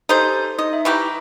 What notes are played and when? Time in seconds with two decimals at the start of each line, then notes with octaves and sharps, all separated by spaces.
0.09 D#4 G4 A4 C5 G#5
0.58 D#4 D#5
0.73 E5
0.85 E3 G3 G4 A#5 B5 C#6